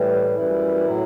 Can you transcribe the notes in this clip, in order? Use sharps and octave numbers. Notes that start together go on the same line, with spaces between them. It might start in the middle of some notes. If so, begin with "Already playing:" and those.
Already playing: A2 E3 G3
F#2 E3 G3 E4
A2 F#3